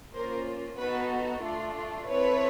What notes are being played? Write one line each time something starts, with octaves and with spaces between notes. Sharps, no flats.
A#3 C#4 F4 A#4 C5
B3 D#4 F#4 A4 B4
A3 D4 F4
C4 E4 A4 B4 C#5